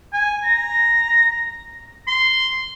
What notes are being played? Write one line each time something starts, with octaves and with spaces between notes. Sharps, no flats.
G#5
A#5
C6